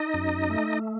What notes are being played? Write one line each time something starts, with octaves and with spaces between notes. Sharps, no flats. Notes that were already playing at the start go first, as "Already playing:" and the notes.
Already playing: D#4 D#5
F#2
A3